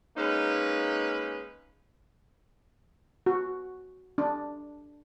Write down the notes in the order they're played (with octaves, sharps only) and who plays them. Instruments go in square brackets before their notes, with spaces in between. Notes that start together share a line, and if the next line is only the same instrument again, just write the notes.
[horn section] G#3 A#3 C#4 D#4 B4
[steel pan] F#4
D4